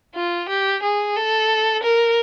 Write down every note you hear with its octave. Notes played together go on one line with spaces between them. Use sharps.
F4
G4
G#4
A4
A#4